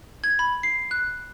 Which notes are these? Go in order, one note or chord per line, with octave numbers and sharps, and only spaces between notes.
G#6
B5
C7
F#6